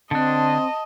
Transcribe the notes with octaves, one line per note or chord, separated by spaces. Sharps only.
D3 C4 D4 D#5 A5